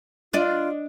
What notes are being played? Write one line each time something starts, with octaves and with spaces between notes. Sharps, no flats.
D4 F4 D5 D#5